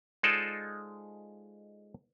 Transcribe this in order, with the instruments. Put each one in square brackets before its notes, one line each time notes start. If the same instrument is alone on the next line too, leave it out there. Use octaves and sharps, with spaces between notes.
[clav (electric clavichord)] G#3 D#4 F4 A4 C5 D5